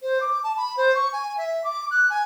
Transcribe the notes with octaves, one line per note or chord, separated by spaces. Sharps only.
C5
D6
A5
B5
C5
C#6
G#5
E5
D6
F#6
G#5